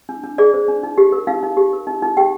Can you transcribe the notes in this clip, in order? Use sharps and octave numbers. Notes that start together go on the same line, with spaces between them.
D4
D4
G#4 D5
C5
D4
D#4
G4
A#4
D#4 F5
D#4
G4
A#4
D#4
D#4
G4 G5